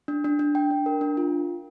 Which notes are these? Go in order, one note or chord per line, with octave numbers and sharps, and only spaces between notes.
D4
D4
D4
G5
D4
A#4
D4
F4